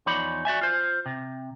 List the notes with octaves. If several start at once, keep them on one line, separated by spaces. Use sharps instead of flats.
E2 F3 D#4 C#5 D5 B5
F#4 D5 E5 G#5
F4 C5
C3